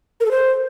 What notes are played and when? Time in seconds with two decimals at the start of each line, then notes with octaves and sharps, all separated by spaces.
0.20 A#4
0.26 A4
0.31 C5